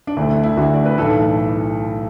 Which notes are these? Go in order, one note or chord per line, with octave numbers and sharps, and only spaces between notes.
D4
D2 D3 A3 E4
D4
E4
D2 D3 A3 F#4
D5
B4
B1 A2 E3 A4